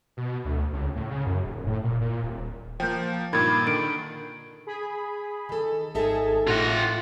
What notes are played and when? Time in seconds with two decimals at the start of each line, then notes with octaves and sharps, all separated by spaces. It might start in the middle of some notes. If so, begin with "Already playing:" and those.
0.17 B2
0.45 D2
0.73 C#2
0.96 A2
1.10 C#3
1.26 F#2
1.46 D#1
1.67 A2
1.84 A#2
2.01 A#2
2.23 D#1
2.80 F3 A#3 G5 G6
3.33 G2 A#2 D#3 B5 G#6 A6
3.67 D3 D#3 D7
4.67 G#4 B5
5.49 D#3 A4
5.95 G#1 D#4 G#4 A4 E5 A5
6.48 A2 F4 F#5